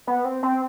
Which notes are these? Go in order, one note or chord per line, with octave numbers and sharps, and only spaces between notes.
B3
C4
C4